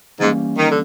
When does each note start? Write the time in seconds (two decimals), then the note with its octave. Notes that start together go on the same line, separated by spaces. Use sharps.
0.20 G#2 E3 G3 A#3 C#4
0.58 D#3
0.70 D3